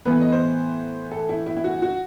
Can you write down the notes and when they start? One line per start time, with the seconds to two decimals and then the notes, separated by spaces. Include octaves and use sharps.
0.05 A2 E3 B3 B4
0.21 D#5
0.32 C5
1.11 A4
1.29 E4
1.46 E4
1.57 E4
1.64 F#4
1.82 F#4